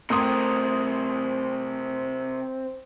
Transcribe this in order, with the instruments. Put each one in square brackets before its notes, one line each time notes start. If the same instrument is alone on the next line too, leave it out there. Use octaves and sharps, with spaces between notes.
[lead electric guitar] C3 A#4 [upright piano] A3 C6 D#6 [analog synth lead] C4